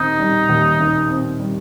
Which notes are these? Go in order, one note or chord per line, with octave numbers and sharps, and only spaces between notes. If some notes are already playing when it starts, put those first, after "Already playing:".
Already playing: D#2 D#3 C4 D#4
G3
D#2
D#3
C4
G3